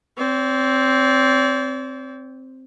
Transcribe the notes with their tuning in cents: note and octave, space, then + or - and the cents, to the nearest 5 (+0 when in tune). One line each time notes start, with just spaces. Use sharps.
C4 +0 D5 -45